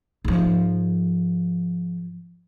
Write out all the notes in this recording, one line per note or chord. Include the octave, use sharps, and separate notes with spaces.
G#2 F3